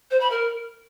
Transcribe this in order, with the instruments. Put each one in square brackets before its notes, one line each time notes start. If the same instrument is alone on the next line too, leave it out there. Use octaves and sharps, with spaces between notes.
[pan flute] C5
B5
A#4